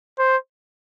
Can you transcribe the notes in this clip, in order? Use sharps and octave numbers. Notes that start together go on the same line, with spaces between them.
C5